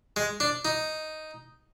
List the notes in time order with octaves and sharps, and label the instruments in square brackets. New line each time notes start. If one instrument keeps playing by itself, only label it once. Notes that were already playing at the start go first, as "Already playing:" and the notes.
[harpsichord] G#3
D4
D#4